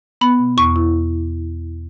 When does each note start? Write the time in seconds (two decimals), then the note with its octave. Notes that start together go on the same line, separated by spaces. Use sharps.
0.21 B3 B5
0.39 B2
0.57 E2 C#6
0.76 E4